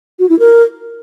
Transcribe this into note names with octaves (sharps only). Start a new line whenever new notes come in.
F#4
E4
A#4